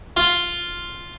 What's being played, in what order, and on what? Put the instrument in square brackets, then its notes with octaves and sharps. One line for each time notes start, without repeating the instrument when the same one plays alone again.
[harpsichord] F4